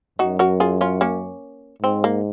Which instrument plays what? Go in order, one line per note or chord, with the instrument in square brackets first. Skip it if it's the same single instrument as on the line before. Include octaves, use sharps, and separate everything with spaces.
[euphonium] F#2 [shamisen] D#4 F#4
[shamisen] F#4 A#4
F4 G#4
C#4 F4
A#3 C#4
[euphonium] G#2 [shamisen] C4
[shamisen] A#3